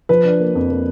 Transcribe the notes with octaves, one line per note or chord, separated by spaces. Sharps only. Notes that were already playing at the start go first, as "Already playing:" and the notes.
F3 B4
D4
A#3
F2
A#3